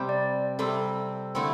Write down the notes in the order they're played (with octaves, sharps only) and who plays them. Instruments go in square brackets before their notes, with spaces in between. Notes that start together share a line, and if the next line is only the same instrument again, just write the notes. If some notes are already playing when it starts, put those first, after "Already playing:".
Already playing: [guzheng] C3 G3 C4 G4
[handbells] D5
[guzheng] C3 G3 C4 G4 [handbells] A4
[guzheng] D3 A3 C4 E4